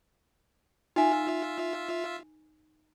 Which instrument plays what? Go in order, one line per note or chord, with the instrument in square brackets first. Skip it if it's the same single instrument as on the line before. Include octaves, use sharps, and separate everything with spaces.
[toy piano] D#4 G#5 [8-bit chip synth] F4 E5